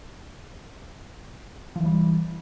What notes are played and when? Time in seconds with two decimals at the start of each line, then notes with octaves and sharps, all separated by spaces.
1.76 F3
1.80 E3
1.85 G3